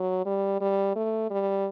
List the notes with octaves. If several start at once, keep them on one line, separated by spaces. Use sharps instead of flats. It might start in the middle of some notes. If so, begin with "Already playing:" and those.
Already playing: F#3
G3
G3
A3
G3